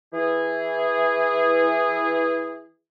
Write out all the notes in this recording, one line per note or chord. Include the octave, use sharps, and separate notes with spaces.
E3 G#4